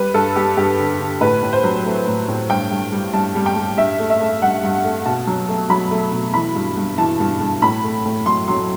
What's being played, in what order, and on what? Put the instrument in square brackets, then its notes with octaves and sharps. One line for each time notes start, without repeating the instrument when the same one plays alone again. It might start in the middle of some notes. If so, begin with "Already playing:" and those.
Already playing: [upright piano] G3 B4
G2 A4
G3 G4
G2 G4
D3
D3
A2 B4
A2
C5
F#3
A3
A2
A2
G2 G5
G2
G3
G2 A5
G3
G5
G3
G2 E5
A3
E5
A3
G2 F#5
G2
A3
B2 A5
F#3
A3
F#3 B5
A3
B2
E3 B5
G2
G2
E3 A5
G2
G2
A2 B5
A3
A2
F#3 C6
F#3 C6